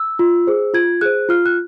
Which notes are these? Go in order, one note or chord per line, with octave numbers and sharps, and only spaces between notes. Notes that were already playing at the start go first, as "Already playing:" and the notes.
Already playing: E6
F4
G#4 C5
F4 G#6
G#4 C5 F#6
F4 F6
F#6